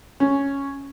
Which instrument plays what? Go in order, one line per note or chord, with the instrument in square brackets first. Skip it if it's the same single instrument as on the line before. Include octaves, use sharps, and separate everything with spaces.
[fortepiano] C#4